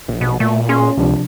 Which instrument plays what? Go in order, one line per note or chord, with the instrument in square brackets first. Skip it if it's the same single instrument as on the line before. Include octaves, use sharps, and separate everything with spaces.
[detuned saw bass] A#1
[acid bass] B2
[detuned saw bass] A#2 [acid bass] A3
[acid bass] C#4 [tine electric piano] G#4 C6
[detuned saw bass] C#2 [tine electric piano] C3 F3 D4